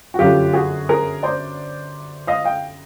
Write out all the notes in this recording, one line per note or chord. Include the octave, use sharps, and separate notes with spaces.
F#4
G1 F#2 D3 F#3 F4 G4
F#4 G#4
G#4 A#4
C5 D5
D#5 F5
F5 G5